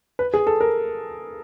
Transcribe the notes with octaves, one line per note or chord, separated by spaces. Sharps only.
B4
G#4
A4
A#4